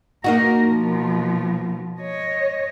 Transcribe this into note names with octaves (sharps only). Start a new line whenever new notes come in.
A#3 D#4 F#4 A#4
B2 F3
C#5 D#5